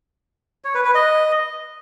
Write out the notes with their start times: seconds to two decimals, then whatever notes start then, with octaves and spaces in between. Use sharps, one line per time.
0.64 C#5
0.75 B4
0.85 B4
0.95 D#5